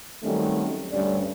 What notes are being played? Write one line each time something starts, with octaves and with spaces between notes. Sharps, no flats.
D#3 F#3 G3 A3 C4 C#4
D2 G2 G3 C#4 D5